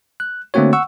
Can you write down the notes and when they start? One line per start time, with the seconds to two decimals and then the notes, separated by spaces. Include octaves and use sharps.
0.20 F#6
0.54 D3 A3 A#3 C4 F#4 C#5
0.73 F#5 C#6 E6